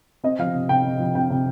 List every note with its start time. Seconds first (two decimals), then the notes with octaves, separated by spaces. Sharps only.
0.24 C4 D#5
0.39 F3 F5
0.54 C3
0.69 C3 G5
0.85 C4
1.00 F3
1.15 C3 G5
1.30 C3